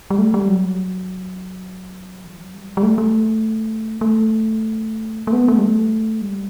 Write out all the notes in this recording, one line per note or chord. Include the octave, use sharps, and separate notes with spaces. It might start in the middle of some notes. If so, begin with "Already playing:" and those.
G3
A3
G3
F#3
E3
F#3
G3
G3
A3
A3
A3
A3
B3
A3
G3
A3
G3